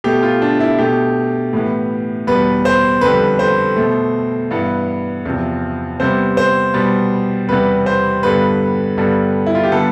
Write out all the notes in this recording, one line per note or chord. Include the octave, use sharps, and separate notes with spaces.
B2 A3 G4
F4
D4
E4
B2 A3 G4
A2 E3 B3
E2 B2 G3 B3 B4
C5
F2 D3 G3 B4
C5
B2 A3
G2 E3 B3
E2 C3 F3
C3 G3 B3 C5
C5
B2 G3 B3
E2 C3 G3 B3 B4
C5
G2 D3 G3 B3 B4
G2 D3 G3 B3
E4
F4
G4
D3 G3 B3 A4